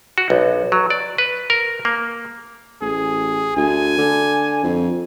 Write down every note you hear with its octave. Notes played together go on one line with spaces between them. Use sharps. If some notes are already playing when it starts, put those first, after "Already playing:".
F#4
B1
F#3
D5
B4
A#4
A#3
A1 G#4
D2 G#5
D3
F2